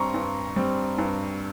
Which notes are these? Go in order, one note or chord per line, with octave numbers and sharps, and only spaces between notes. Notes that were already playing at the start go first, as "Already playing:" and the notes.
Already playing: G2 G3 C4 A#5 C6 C#6
G2
G3 C4
G2